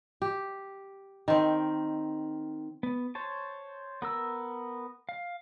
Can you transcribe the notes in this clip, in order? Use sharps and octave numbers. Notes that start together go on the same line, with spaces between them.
G4
D#3 C4
B3
C5 C#5 A5
B3 A#4 E6
F5